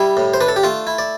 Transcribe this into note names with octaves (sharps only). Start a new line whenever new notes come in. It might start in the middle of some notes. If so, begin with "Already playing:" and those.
Already playing: G3 E4
A2
C5
D4 B4
A4
G4
A3 F4
E4
D5